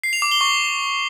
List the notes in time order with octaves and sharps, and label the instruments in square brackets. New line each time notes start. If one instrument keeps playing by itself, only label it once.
[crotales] C7
F7
D6
G7
C#6